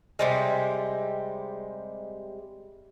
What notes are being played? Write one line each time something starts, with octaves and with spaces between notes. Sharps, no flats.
C3 G3 G#3